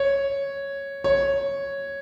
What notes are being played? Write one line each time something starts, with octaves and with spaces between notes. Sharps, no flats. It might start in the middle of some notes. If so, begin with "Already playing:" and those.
Already playing: C#5
C#5